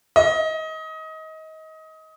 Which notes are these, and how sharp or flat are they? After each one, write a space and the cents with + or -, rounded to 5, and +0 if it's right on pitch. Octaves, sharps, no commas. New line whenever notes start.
D#5 +25